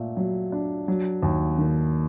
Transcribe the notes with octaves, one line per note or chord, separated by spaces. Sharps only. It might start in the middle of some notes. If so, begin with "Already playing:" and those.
Already playing: A#2 A3
F#3
D4
F#3
D#2
D#3